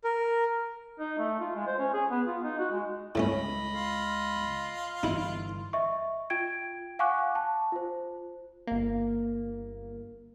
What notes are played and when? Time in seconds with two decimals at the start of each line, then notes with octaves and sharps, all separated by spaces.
0.04 A#4
1.00 D#4
1.19 A3
1.40 F4
1.55 G#3
1.67 C5
1.78 C#4
1.94 G#4
2.11 B3
2.27 F4
2.44 D#4
2.59 F#4
2.71 G#3
3.15 C#2 A2 A3 C#4 D#5 B5
3.73 F4
5.03 G1 D3 E3 D#4 E4
5.73 D#5 E5 C#6
6.30 F4 G5 G#6 D7
6.99 F5 F#5 G#5 C#6 D6 F#6
7.35 A5
7.72 F4 C5
8.67 G1 A#3